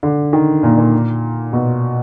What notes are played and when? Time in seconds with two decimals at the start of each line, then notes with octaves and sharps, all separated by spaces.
0.03 D3
0.33 D#3
0.63 A#2
0.78 A#2
1.53 B2